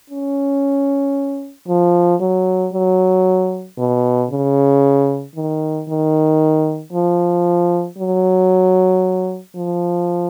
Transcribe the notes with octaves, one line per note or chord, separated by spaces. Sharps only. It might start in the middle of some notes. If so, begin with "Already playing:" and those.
C#4
F3
F#3
F#3
B2
C#3
D#3
D#3
F3
F#3
F3